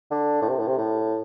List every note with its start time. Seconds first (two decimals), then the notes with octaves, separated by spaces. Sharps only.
0.11 D3
0.42 A2
0.48 C3
0.59 A2
0.67 C3
0.78 A2